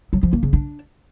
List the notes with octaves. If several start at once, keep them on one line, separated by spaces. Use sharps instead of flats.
F#3
F3
A#3
C#3
D4